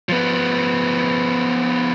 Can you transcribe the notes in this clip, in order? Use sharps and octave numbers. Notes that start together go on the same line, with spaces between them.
F3 B3